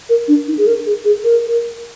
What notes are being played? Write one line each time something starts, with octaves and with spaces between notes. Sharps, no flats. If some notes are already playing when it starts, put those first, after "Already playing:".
A#4
D4
D#4
G#4
A#4
G#4
G#4
A#4
A#4